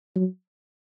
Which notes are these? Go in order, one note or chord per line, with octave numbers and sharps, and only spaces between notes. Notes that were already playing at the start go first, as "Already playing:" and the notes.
F#3